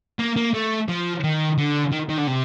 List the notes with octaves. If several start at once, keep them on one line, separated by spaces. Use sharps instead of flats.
A#3
A#3
A3
F3
D#3
D3
D#3
D#3
D3
C3